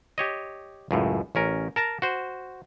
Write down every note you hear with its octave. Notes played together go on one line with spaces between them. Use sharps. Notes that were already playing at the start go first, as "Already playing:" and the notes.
G4 C#5 D#5
C#2 F#2 A2
A1 C#4 A#4
A#4 A5 A#5
F#4 C5